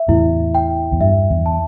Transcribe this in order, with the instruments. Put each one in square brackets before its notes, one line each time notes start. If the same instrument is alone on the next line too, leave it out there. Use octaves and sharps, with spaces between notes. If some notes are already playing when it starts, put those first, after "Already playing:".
Already playing: [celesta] E5
[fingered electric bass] E2 A2 [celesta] E4
[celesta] G5
[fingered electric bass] E2
[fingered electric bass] G2 [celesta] E5
[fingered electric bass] E2
[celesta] A5